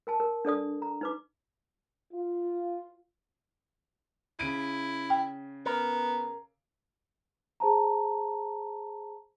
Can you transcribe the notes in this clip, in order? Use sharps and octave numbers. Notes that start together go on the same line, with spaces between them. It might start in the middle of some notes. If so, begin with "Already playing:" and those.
A#4 G#5 A5
A#4
D4 A4 D5 D#6
A#5
D#4 B4 D6
F4
C#3 E4 D7 D#7
G5
B3 A#4
G#4 C5 A5 A#5